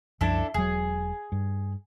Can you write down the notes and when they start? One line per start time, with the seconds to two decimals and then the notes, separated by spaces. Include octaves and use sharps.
0.21 C2 F#2 F3 D4 E4 A4
0.54 E1 F#3 G#4
1.32 G2